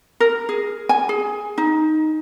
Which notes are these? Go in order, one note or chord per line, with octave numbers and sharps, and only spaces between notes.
A#4
G#4
G#5
G#4
D#4